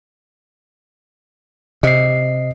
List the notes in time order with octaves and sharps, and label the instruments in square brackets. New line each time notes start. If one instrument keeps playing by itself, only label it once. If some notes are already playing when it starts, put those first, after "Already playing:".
[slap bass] C3 [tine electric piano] D#5 C7